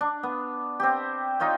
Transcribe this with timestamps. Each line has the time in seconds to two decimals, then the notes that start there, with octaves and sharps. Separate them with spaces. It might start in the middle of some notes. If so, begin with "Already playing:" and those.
0.01 D4
0.23 B3
0.80 C4 G4
1.40 D#4 F4 C#5 G5